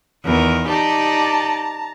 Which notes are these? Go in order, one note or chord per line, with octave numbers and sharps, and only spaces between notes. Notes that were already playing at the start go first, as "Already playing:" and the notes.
E2 D#3 A#4
D#4 G4 D5 A5 A#5